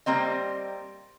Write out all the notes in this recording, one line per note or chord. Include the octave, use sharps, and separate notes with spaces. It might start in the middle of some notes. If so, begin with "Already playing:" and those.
G3 A#3 C4 D#5